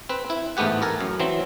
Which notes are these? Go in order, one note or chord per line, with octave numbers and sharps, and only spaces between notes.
C4 B4
E4
A1 G#2 A3 B3 G4 F#5
A4 A#4 G#5
F#2
E3 F#3 C4